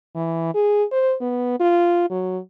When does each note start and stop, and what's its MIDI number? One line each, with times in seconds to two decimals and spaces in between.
0.15 0.52 52
0.54 0.84 68
0.92 1.14 72
1.21 1.55 59
1.60 2.05 65
2.10 2.38 54